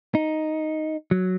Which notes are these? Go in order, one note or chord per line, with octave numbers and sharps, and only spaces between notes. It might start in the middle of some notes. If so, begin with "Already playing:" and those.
D#4
F#3